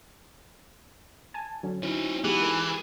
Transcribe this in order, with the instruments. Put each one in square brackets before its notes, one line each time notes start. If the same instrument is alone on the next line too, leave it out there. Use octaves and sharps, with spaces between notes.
[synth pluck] G#5 A5
D3 F#3 C#4
[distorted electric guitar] C4 C#5 [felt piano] D#4 E4 F#4
[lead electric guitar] E3 [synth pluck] G#3 G4 [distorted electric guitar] B3
[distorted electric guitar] G#4 A#4